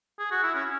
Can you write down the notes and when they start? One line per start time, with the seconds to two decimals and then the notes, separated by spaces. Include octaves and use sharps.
0.19 G#4
0.31 F#4
0.43 E4
0.55 C#4